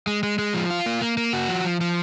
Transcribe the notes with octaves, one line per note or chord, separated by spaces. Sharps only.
G#3
G#3
G#3
F3
F4
A#3
A#3
A#3
F#4
F3
F3
F3